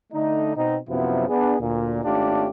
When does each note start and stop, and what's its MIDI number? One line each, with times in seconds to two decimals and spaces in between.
0.13 0.54 50
0.13 0.54 57
0.13 0.54 62
0.13 0.54 63
0.56 0.78 47
0.56 0.78 60
0.56 0.78 63
0.88 1.29 42
0.88 1.29 48
0.88 1.29 53
0.88 1.29 54
0.88 1.29 59
0.88 1.29 64
1.29 1.56 59
1.29 1.56 62
1.29 1.56 68
1.60 2.00 38
1.60 2.00 46
2.04 2.47 32
2.04 2.47 57
2.04 2.47 61
2.04 2.47 62
2.04 2.47 65
2.04 2.47 67